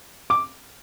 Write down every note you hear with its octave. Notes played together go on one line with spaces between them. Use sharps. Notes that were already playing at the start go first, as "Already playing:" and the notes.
D6